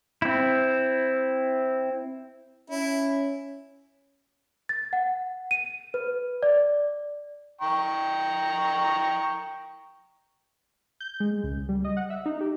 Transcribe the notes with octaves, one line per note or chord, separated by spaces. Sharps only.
C4 E4
C#4 E4
A6
F#5
D#7
B4
D5
G5 A#5 C#6
G6
G#3
C#2
G3
D#5
F#5
E5
D#4
G4